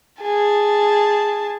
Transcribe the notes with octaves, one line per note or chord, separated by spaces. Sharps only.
G#4 A5